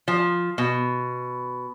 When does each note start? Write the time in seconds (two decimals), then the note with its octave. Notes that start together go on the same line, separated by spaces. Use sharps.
0.08 F3
0.58 B2